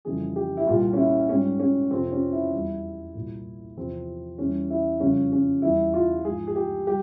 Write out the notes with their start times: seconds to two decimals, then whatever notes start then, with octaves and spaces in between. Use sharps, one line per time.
0.05 F2 C#3 E3 G3 G#4
0.36 G4
0.57 E4
0.66 C2 A#2 G3 F4
0.93 C#4
0.97 E4
1.29 G#2 G3 C#4
1.60 C#4
1.91 F2 C3 F3 C4
2.12 C#4
2.32 E4
2.53 E2 E3 G3
3.15 C2 A#2 G3
3.76 E2 C3 F3 C4
4.38 E2 E3 G3 C#4
4.70 E4
5.00 F2 C#3 G3 C#4
5.32 C#4
5.62 E2 E3 G3 E4
5.94 F4
6.25 G#2 F3 G#4
6.47 G#4
6.56 G4
6.86 G3 G4